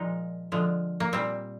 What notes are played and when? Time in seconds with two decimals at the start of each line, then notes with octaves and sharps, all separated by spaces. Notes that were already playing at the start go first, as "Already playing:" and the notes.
Already playing: A#2 F3 G#3 D#4
0.52 D3 F3 G#3
1.00 A#3
1.12 A#2 G3 C4